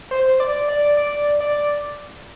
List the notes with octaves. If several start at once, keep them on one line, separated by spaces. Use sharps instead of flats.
C5
D5
D5
D5
D5